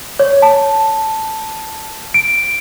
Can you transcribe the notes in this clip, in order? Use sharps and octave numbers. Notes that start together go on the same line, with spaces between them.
C#5
A5
D7